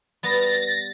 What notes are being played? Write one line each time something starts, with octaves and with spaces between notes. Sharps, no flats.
G3 B3 A6 A#6